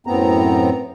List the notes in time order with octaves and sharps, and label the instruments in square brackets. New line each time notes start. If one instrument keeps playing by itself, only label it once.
[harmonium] F#2 A2 B3 C4 A#5